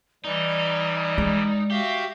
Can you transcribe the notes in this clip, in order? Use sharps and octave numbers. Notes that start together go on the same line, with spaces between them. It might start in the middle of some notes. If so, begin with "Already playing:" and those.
E3 G3 D#4 D5
G#3
F#4 G4 E5 F5